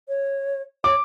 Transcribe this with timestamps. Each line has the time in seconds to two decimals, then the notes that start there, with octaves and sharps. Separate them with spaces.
0.08 C#5
0.84 C#5 D6